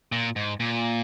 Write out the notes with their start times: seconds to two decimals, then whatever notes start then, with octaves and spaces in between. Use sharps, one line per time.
0.12 A#2
0.36 G#2
0.60 A#2